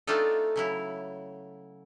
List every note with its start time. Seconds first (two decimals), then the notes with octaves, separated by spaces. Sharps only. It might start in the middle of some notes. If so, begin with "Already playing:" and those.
0.07 A3 C4 D4 D#4 F4 A4
0.56 C#3 F#3 E4